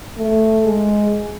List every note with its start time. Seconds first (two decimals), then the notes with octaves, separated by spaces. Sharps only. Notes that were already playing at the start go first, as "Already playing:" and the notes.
0.17 A3
0.66 G#3